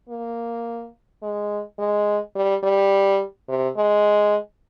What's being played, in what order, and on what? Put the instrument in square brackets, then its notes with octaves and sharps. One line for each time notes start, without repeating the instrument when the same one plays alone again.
[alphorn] A#3
G#3
G#3
G3
G3
C3
G#3